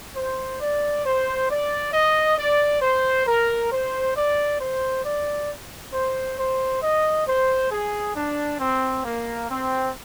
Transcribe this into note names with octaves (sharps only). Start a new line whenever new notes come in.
C5
D5
C5
D5
D#5
D5
C5
A#4
C5
D5
C5
D5
C5
C5
D#5
C5
G#4
D4
C4
A#3
C4